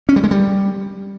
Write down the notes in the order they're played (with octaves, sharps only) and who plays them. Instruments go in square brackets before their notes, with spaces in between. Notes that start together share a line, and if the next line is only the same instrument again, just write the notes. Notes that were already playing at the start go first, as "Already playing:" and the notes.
[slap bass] C#4
G3
G#3
G3